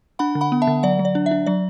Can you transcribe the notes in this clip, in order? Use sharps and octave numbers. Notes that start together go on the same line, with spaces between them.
D4 F#5 B5
D3
F#5 B5
B3
E5 A5
D3
F#3 D5 F#5
F#3
D5
D4
E5
D4
F#3 D5